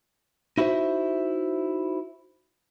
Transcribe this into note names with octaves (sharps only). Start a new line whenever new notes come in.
D#4 E4 F#4 G4 C5 E5